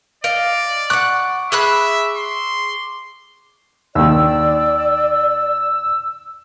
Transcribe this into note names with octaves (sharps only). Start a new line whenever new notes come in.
D5 D#5 F5 D7
F#5 C#6 D6 F#6
G#4 E5 B5 D6 F#6
C6
D#2 D#3 D5 E6